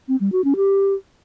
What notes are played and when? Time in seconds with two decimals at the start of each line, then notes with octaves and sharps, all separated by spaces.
0.08 C4
0.20 G3
0.32 F#4
0.44 C#4
0.56 G4